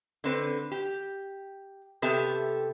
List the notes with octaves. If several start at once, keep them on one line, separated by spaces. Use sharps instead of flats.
D3 C4 B4
G4
C3 B3 G4 A4 E5